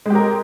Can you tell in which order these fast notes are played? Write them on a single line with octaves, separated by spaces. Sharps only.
G#3 G4 A#4